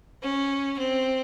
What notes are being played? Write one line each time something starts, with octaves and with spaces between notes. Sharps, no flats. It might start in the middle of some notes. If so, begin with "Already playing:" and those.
C#4
C4